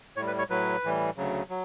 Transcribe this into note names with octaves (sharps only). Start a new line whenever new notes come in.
A2 G3 C#5
B4
C#5
A2 F#3 B4
A2 E3 G3
D2 C#3 F#3
F#3